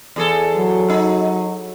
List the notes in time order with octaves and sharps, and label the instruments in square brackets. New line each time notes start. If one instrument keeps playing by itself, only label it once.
[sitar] E2 G#4 A4
[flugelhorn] F#3
[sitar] D#4